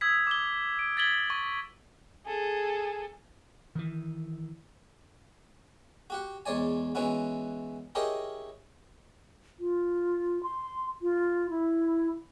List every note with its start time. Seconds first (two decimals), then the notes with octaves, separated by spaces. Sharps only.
0.01 D#6 E6 G#6 B6
0.27 D6 G7
0.79 D7
0.97 G#6 A6 B6 F#7 G7
1.30 C#6
2.26 G#4 A4
3.75 D#3 E3
6.10 F#4 G4 F#5
6.46 E2 G#3 C#5 D5 G#5
6.95 E3 G#3 B3 C#4 E4 F#4
7.95 E4 G4 G#4 A#4 C#5 D#5
9.60 F4
10.43 C6
11.02 F4
11.50 E4